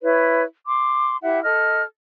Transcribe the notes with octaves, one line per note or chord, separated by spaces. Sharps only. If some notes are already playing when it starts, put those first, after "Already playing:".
E4 B4 C#5
C6 D6
E4 G4 E5 F#5
A4 D#5 F6